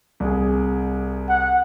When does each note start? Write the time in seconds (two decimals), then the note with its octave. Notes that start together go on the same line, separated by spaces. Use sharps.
0.20 C2 G#4
1.29 F#5